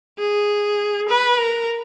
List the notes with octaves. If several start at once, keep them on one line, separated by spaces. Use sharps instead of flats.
G#4
B4
A#4